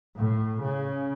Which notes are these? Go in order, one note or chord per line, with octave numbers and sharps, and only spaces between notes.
A2
C#3